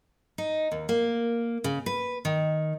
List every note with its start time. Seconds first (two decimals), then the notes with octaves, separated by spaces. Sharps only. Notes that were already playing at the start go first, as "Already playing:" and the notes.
0.38 D#4
0.72 D#2
0.89 A#3
1.64 C#3
1.86 B4
2.25 D#3